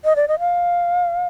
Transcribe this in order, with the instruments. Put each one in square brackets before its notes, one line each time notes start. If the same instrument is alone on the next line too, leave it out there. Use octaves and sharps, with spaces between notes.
[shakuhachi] D#5
D5
D#5
F5